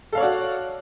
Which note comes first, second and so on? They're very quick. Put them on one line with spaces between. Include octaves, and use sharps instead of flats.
A4 F5 C#5 D5 F#4